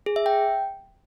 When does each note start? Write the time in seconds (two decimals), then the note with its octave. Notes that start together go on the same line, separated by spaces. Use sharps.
0.06 G#4
0.16 E5
0.26 G5